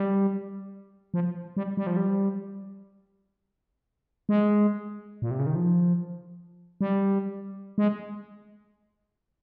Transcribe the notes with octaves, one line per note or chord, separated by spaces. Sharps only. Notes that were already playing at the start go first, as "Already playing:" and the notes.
Already playing: G3
F3
G3
G3
F3
G3
G#3
A#2
C3
C#3
D#3
F3
G3
G#3